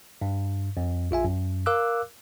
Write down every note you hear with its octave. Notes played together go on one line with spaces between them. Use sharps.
G2
F2
A#1 F4 E5 G#5
F#2
A#4 F5 D6 E6 F#6